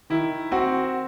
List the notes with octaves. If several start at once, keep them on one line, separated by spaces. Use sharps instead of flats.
D#3 E4
C4 F#4